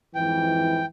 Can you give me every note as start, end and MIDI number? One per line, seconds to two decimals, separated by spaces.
0.15 0.84 41
0.15 0.84 44
0.15 0.84 52
0.15 0.86 79